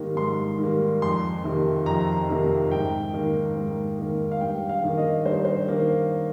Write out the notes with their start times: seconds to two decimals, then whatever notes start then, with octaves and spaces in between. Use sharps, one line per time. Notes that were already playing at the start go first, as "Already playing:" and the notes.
Already playing: G#2 D#3 G3 A#3
0.16 G#2 C6
0.59 D#3 G3 A#3
1.02 F2 C6
1.44 C3 D#3 A#3
1.86 F2 A#5
2.29 C3 D#3 A#3
2.71 G#2 G5
3.14 D#3 A#3
3.56 G#2
3.98 D#3 A#3
4.32 F5
4.41 G2 G5
4.69 F5
4.84 D#3 A#3
4.97 D#5
5.25 G2 C5
5.45 C5
5.68 D#3 A#3